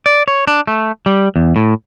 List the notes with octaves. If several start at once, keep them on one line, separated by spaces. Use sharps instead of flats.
D5
C#5
D4
A3
G3
E2
A2